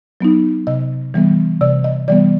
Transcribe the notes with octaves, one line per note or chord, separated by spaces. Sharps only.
F#3 B3 D#4
C3 D#5
E3 G3 B3
C3 D5
D#5
E3 G3 B3 D5